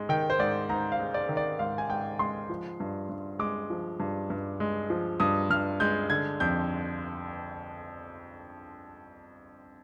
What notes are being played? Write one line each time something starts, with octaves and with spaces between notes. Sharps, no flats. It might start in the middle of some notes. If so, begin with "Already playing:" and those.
Already playing: G#2 G#3
D#3 G5
C5
G#2 D5
G#2 A#5
F5
G#3
D5
D#3
D5
G#2 F5
G#5
G#2 G5
G#3 C6
F3
G2
G2
G#3 D6
F3
G2
G2
G#3
F3
G2 D#6
G2 F6
G#3 G6
D3 G#6
F2 G6